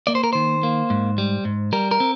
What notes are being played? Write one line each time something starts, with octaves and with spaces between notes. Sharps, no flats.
A#3 D5
C5
A#4
D#3 C5
A#3
G#2
G3
G#2
G3 A#4
A#4
C4